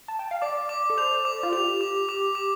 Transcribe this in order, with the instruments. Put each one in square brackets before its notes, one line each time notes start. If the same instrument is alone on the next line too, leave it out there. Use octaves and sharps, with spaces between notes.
[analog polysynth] A5
G5
F5
[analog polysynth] D5 [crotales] D6
[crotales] D6
[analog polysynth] A4
[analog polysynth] C5 [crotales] F7
[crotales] D6
[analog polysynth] F4
[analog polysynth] G4 [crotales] F7
[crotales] D6
D6
D6